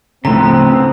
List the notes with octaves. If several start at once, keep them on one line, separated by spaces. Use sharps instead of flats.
D2 A2 C#3 F3 B3 C4 A#5